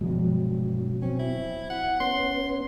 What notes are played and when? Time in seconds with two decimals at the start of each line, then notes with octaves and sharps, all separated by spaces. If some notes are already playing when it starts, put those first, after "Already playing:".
0.01 G2 B2 F3 F#3 G#3
1.02 C4 C#4
1.19 E4
1.70 F#5
2.00 B3 C#4 C6